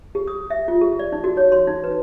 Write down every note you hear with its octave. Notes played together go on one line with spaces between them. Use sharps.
G4
D#6
E5
F4
G4
D5
D#4
F#4
C#5
C6
D#4
B4